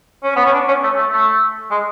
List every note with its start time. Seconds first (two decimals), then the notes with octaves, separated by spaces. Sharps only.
0.23 C#4
0.36 B3
0.45 C#4
0.53 D4
0.68 C#4
0.83 A3
0.98 A3
1.12 A3
1.71 G#3